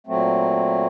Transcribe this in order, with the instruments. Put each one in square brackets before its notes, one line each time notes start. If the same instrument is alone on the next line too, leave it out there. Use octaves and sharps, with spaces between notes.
[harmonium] A#2 F#3 A3 C4